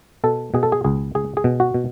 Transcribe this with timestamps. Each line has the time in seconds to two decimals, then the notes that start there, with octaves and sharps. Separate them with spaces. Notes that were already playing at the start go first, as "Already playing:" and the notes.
0.24 B2 A4
0.54 B2 G#4
0.63 A4
0.72 G#4
0.84 C#2 G#4
1.15 C#2 G#4
1.37 G#4
1.44 B2
1.60 F#4
1.74 B2